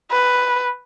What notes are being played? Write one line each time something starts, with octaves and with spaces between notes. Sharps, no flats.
B4